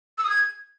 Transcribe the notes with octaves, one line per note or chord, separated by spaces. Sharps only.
E6
D#6
G#6